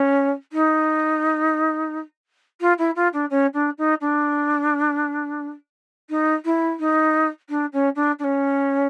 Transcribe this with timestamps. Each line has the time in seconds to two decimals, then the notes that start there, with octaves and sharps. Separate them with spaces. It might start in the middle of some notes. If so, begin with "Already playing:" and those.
Already playing: C#4
0.52 D#4
2.61 F4
2.78 E4
2.96 F4
3.13 D4
3.30 C#4
3.53 D4
3.78 D#4
4.01 D4
6.10 D#4
6.45 E4
6.79 D#4
7.49 D4
7.73 C#4
7.95 D4
8.19 D4
8.24 C#4